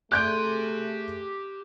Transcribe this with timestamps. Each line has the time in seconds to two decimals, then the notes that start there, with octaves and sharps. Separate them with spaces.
0.12 A3 G4 G#4 C6 F#6 G6 D7